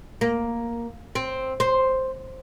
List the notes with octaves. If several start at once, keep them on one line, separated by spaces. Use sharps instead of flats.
A#3
C4
C5